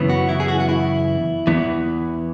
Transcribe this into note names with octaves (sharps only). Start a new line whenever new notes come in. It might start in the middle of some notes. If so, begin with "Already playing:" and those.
Already playing: F#2 C#3 E3 B3
F#4
E4
G#4
F#4
F#4
E4
E2 E3 B3